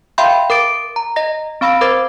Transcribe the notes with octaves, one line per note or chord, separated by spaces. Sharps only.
E5 F5 G5 B5 C6 G6
A#4 D6 A6 D7
A#5
D#5 A#6
C4 F5 B5 E6 A#6 D7
A#4 C5 D6 G#6 A6